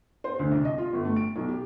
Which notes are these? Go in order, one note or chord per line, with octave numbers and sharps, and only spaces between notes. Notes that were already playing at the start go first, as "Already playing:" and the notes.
C5
D2
C2
D#5
F4
G1
A3
D7
B1
G4